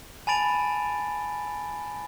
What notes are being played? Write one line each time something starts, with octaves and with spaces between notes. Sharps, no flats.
G#5 A5 B5 A6 D7 F7